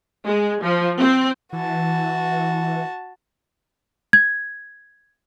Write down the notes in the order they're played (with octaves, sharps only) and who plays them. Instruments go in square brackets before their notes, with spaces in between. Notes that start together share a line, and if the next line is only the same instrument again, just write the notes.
[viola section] G#3
F3
C4
[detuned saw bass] E3 [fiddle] F#4 A5
[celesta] G#6